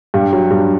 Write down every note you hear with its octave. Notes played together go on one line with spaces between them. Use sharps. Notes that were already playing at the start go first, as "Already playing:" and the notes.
G2
F#3
G2